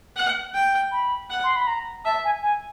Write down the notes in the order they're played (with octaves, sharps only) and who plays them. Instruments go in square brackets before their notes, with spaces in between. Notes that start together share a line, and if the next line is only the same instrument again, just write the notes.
[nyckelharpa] F#5
G5
[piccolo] B5
[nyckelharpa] F#5
[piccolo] C6
B5
A#5
[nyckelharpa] E5 [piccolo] A5
[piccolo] G#5
G#5